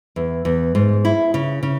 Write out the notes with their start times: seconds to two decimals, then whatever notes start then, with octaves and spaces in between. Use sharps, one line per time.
0.16 E2
0.45 E2
0.75 G#2
1.05 E4
1.34 C#3
1.63 C#3